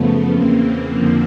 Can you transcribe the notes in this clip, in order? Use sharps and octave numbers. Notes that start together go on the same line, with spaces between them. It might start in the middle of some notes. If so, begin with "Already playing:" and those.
Already playing: F#2 C#3 F3 A3 B3
E2 C#3 E3 A#3 C4
F2 D3 F3 A#3 C4